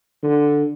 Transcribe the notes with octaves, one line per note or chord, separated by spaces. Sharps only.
D3